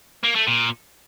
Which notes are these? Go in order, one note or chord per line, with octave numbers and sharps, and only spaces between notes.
A#3
A3
A#2